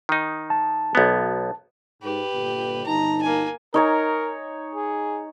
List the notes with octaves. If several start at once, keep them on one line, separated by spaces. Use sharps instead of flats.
D#3 D#4
A5
B1 B3
G#2 G4 B4
G1 A#2
G1 D#4 A5 A#5
A#3 G#5
D#4 A#4 C#5 G#5
G#4